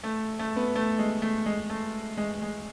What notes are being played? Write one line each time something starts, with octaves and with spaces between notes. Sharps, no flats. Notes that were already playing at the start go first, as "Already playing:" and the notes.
A3
A3
B3
A3
G#3
A3
G#3
A3
G#3
G#3